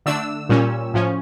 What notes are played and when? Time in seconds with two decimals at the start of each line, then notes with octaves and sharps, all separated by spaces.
0.06 D3 A3 D4 E6
0.49 A#2 G3 C#4
0.94 A2 F3 C#4